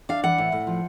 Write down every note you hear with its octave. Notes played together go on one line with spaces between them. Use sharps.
D4 F5
E3 F#5
A2
A2
F3